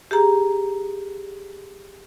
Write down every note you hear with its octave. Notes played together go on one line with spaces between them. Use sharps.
G4 G#4 A#5